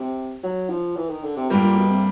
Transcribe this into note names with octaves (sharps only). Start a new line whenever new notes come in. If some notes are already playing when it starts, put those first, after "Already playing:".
Already playing: C3
F#3
F3
E3
D#3
D3
C3
G2 A#2 D3 G3 A#3
A#2
B2
C3